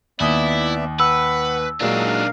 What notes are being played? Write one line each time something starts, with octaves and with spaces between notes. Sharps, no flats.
D#2 B3 E4 D5 E5 D#6 G7
B4 F#5 E6
A#2 F#3 G#3 D4 D#4 A#4 F5